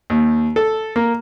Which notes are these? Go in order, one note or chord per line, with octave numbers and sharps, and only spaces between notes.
D#2
A4
A#3